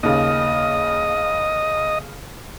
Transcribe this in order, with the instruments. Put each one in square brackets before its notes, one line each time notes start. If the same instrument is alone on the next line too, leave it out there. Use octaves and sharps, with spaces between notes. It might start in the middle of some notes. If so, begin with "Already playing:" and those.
[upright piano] D#2 C#3 [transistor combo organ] D#5